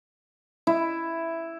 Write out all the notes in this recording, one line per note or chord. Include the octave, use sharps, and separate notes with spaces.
E4